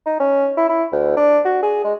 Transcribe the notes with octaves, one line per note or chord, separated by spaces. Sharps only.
D#4
C#4
E4
E4
D2
D4
F#4
G#4
G#3